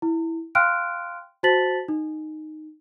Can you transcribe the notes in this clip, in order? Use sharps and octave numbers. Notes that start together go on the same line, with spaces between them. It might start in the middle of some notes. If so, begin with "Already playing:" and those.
E4
F5 G5 C6 F6 F#6 D7
F#4 C5 A5 A6 B6 F#7
D#4